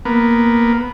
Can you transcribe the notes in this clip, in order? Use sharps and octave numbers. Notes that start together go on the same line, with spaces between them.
A#3 B3